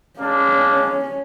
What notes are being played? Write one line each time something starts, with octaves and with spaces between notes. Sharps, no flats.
G#3 A#3 C#4 D4